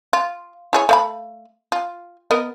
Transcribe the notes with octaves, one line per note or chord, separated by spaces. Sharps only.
F4
E4 G#4 C#5
A3 F5 B5
F4
B3 A#4 D#5